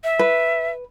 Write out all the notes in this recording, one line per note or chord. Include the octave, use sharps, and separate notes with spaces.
E5
B4